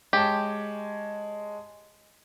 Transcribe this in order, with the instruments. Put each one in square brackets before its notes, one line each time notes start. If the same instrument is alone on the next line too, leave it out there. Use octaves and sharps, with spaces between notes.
[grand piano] G#3 C#5 A5 [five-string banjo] G4